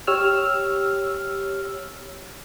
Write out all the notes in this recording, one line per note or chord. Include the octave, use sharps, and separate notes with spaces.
G4 C#5 E6 F6